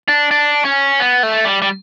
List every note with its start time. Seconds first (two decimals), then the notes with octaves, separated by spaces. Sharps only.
0.08 D4
0.31 D4
0.65 C#4
1.00 B3
1.23 A3
1.45 G3
1.62 G3